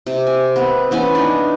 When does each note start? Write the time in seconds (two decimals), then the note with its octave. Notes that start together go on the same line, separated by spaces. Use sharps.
0.06 C3
0.27 G#5
0.56 B3 C4
0.91 E3 B3 C#4 G#5
1.15 D4 D#4